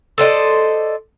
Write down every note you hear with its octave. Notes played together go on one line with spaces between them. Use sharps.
A4 C5 D5 D#5